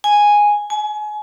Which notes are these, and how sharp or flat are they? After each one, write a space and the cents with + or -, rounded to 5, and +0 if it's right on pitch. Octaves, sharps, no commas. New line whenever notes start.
G#5 -5
G#5 +30